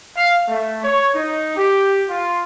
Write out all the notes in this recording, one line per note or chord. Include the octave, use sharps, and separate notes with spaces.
F5
A3
C#5
D#4
G4
F4